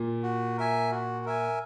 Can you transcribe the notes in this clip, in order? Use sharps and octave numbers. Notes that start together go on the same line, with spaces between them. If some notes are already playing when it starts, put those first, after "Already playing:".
Already playing: A#2
F#4
A#4 E5 G#5
F#4
A#4 E5 G#5